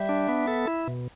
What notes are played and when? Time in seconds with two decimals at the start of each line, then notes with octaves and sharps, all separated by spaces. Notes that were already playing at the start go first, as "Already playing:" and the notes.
Already playing: G3 E5
0.09 D4
0.29 B3
0.47 A4
0.67 E4
0.87 B2